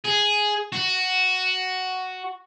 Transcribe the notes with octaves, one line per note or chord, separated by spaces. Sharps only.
G#4
F#4